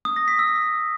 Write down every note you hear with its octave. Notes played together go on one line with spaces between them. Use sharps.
D#6
A#6
B6
E6